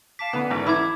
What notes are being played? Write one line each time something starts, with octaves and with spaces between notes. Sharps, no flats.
F5 A5 D6 B6
D3 E3 B3
G#1
E4 B5 D6 G#6